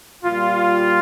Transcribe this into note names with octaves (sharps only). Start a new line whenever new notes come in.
A#2 G3 F4